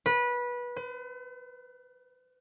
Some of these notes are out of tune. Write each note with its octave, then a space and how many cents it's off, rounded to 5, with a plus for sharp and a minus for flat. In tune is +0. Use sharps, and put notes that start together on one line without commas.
B4 -20
B4 +45